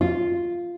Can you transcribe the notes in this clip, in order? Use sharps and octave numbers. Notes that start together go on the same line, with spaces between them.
F4